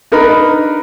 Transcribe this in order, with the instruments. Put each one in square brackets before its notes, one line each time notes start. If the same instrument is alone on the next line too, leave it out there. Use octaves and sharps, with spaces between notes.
[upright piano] D4 D#4 A#4 B4 A#5 B5